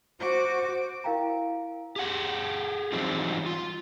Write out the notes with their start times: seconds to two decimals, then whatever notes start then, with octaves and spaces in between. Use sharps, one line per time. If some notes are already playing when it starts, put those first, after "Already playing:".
0.20 F#4 C5 D6
1.04 E4 A#4 F5 G5 A#5
1.96 G4 G#4 F#5
2.92 E3 F#3 G3 C4 D#4 F4
3.46 F4